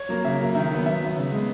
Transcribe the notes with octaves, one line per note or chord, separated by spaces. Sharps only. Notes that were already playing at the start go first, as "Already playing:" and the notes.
Already playing: C#5
F#3 A#3
C#3 E5
F#3 A#3
D#3 E5
F#3 B3
D#3 E5
F#3 B3
C#3
G#3 B3